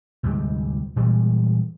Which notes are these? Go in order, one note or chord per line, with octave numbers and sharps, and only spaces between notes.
D2 G#2 C3 G3
A#2 E3 G3 G#3